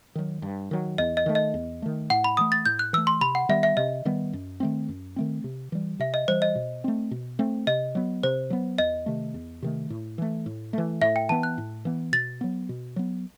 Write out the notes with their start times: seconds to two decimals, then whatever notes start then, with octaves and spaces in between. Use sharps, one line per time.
0.15 D#3 F#3
0.42 G2
0.71 D#3 F#3
0.98 E2 D#5
1.17 D#5
1.26 D#3 A3
1.35 D#5
1.54 E2
1.82 D#3 A3
2.10 A2 F#5
2.24 B5
2.37 E3 A3 D#6
2.52 A6
2.66 A2 G6
2.79 F#6
2.93 E3 A3 E6
3.07 C6
3.21 C3 B5
3.35 F#5
3.49 D#3 G3 B3 E5
3.63 E5
3.77 C3 D#5
4.05 D#3 G3 B3
4.33 F#2
4.60 D#3 A3 C4
4.88 F#2
5.16 D#3 A3 C4
5.44 C3
5.72 E3 G3
5.99 C3 E5
6.14 D#5
6.28 E3 G3 C5
6.42 D#5
6.55 B2
6.84 A3 C4
7.11 B2
7.39 A3 C4
7.67 C3 D#5
7.95 F#3 B3
8.23 C3 C5
8.50 F#3 B3
8.78 E2 D#5
9.06 C3 D#3 A3
9.34 E2
9.62 C3 D#3 A3
9.90 A2
10.18 E3 A3
10.46 A2
10.73 E3 A3
11.01 A2 E5
11.16 G5
11.29 E3 B3 A5
11.43 F#6
11.58 A2
11.85 E3 B3
12.13 B2 A6
12.41 F#3 B3
12.69 B2
12.96 F#3 B3